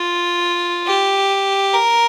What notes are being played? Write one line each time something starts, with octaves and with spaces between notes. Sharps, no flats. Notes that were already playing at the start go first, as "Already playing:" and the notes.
Already playing: F4
G4
A#4